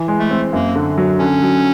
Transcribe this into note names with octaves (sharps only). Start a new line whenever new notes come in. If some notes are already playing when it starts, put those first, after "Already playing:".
Already playing: E3
G#3
A3
C4
F#2 A#3
D3
F#3
D3 C#4
F#3